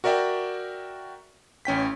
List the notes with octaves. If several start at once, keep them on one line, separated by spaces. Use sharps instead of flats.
F#4 A#4 D5 E5 G5
A1 C#4 G5 B6